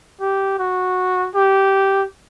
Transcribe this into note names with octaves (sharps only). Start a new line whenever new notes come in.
G4
F#4
G4